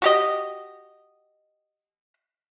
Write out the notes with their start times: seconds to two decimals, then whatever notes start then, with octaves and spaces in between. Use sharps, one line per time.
0.02 F#4 G4 D#5